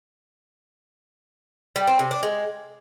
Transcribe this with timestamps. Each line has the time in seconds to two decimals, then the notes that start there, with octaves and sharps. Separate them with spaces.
1.76 G3
1.87 C4
1.99 C3
2.11 D4
2.23 G#3